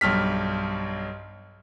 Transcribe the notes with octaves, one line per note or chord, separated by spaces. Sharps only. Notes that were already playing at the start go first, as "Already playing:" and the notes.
B1 G2 F6 B6